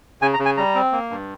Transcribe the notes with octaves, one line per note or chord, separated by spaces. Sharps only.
C#3 G#5
A#5
C#3
G#5
G3 A#5
C4
A#3
G2